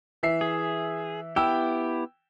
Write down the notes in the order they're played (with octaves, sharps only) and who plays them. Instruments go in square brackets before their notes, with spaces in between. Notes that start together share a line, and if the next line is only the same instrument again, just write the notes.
[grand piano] E3 E5 C7
[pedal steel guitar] G#4
[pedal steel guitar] B3 E4 G4 [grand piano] G5 E6